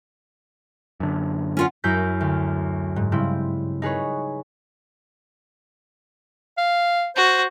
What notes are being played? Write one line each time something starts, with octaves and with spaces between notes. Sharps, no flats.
F#2 D3
C#4 F4 F#5
F#2 E4 A#5 G6 B6
D2
G#2
G2 C#3 C4 E4
D#4 G#4 B4 C#5
F5
F#4 C5